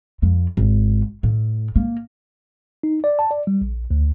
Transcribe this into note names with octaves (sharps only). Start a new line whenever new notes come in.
F2
G#1
A2
A#3
D#4
D5
A5
D5
G3
A#1
D2